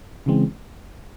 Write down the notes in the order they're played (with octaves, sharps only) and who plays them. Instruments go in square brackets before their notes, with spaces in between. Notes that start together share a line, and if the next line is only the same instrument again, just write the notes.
[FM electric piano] C#3 E3 G#3 C4